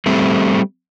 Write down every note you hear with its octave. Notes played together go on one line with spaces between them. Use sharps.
G3 A3 C4